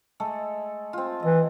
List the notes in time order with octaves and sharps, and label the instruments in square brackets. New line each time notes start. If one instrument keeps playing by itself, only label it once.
[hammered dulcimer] G#3 A3 A4
C4 F4
[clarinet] E3 [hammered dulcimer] D#5